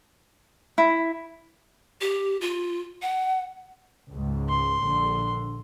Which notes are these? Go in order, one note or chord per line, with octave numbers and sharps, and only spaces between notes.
E4
G4
F4
F#5
C#2 G#2
C6
A#1 D3